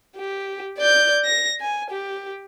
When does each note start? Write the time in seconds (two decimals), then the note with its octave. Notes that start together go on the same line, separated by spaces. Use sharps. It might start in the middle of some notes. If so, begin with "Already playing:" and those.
0.16 G4
0.78 D5 G6
1.25 A#6
1.61 G#5
1.91 G4